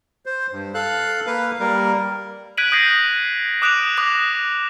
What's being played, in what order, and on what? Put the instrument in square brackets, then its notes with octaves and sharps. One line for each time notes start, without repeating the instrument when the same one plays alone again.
[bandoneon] C5
G2
A4 F5 F#6
A#3 B4 F5
G3 A#3 A#4
[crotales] F#6 G#6 B6 D7 D#7 F#7
D#6 G6 A#6 C7
D6 D#6 F#6 D7 E7 F7
D6 D#6 F#6 A#6